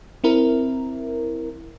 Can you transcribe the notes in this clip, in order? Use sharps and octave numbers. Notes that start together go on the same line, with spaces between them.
C4 E4 A#4